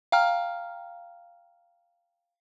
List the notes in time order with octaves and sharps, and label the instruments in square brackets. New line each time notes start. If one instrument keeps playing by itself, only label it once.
[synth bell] F5 G5 A#5 F6